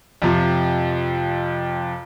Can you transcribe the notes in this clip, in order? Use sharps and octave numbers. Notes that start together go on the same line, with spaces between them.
F2 C3 F3